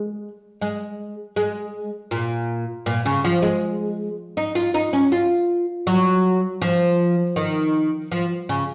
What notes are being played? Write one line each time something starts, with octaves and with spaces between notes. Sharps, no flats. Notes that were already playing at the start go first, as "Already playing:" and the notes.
Already playing: G#3
G#3
G#3
A#2
A#2
C#3
F3
G#3
D#4
F4
D#4
C#4
F4
F#3
F3
D#3
F3
C#3